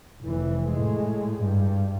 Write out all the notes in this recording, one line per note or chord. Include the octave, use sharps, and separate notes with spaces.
F1 E3
A2 G#3
G2